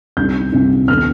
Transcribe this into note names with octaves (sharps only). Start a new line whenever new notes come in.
C2 C3 G3 C4 D#4 G6
C2 C3 G3 C4 D#4
D#2 D#3 B3 F6